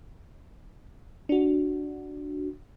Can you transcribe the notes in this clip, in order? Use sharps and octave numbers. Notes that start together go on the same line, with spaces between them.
D4 F#4